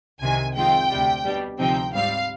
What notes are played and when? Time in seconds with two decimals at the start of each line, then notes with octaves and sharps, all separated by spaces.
0.21 C2 C3 D#3 G#5
0.55 F2 D#3 G#3 C4 F4 G5
0.90 D2 C3 G3
1.25 B2 G3 D4
1.59 D2 C3 F3 C4 D#4 G5
1.94 G#2 G3 C4 F5